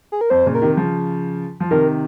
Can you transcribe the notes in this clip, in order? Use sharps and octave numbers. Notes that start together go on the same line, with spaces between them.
G#4
A#4
F2 C5
A#2 C#3
A#4
C3 D#3
C#3 F3
F3
C3 D#3 A#4